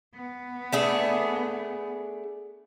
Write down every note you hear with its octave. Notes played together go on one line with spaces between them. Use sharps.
B3
A3 D4 G#4